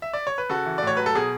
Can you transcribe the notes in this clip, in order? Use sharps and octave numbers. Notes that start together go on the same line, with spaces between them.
E5
D5
C#5
B4
C#3 F#4 A4
E3
D5
A2 C#5
F#3 B4
A4
B2 G#4